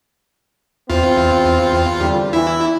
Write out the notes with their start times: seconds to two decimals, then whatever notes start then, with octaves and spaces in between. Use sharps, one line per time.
0.90 E2 C4 F4
2.00 D3 G3
2.33 E2 E3 E4